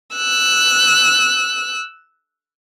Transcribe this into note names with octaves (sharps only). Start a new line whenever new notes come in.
E6 F#6